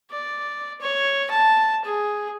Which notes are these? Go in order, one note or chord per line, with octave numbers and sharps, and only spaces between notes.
D5
C#5
A5
G#4